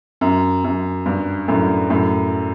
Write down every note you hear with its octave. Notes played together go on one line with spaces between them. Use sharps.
F#2
F#2
G2
F#2 A2
F#2 A2